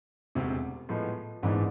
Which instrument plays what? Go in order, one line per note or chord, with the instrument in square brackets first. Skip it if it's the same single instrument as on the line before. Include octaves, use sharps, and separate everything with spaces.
[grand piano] E1 D2 C3
A2 F3 G#3 B3
G#1 G#2 E3 B3 D4